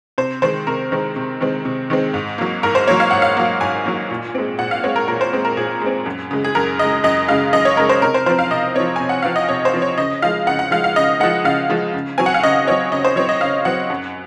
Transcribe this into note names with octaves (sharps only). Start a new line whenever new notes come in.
C3 C5
D#3 G#3 C4 C5
C3 A#4
D#3 G#3 C4
C3
D#3 G#3 C4
C3
D#3 G#3 C4
G#2
F#3 A#3
G#2 A#4
C5
F#3 A#3 C#5
F5
G#2 F#5
F5
F#3 A#3
G#2 G#5
F#3 A#3
A#2
G#3 C4
A#2 F#5
F5
G#3 C4 C#5
A#4
A#2 A#4
C5
G#3 C4
A#4
A#2 G#4
G#3 C4
F#2
C#3 G#3
G#4
F#2 A#4
C#3 G#3 D#5
F#2 D#5
C#3 G#3 F5
F#2 D#5
C#5
C#3 G#3 A#4
C5
C3 A#4
C5
F3 C4 C5
F5
C3 D#5
F3 C4 C#5
C3 G#5
F#5
F3 C4 F5
D#5
C3 C#5
C5
F3 C4
C#5
C#3 D#5
F3 G#3 F5
C#3 F#5
F#5
F3 G#3 F5
F5
C#3 D#5
F3 G#3 F#5
C#3 F5
F3 G#3
C#3
F#3 C4 G#5
F#5
F5
C#3 D#5
F#3 C4 C#5
C#3 D#5
C5
F#3 C4 C#5
D#5
C#3 F5
F#3 C4 F#5
F#2